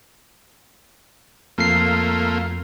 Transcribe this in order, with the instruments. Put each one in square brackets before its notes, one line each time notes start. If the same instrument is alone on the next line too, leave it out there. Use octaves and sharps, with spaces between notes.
[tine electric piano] F2 C7 [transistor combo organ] A3 A#3 F4